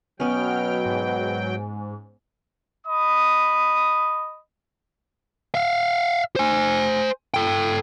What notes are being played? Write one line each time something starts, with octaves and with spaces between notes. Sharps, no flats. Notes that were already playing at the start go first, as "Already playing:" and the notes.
B2 F#3 B3 C#4 G5 F6
G#2
D#5 B5 D#6
E5 F5
C5 G#5
A4 G5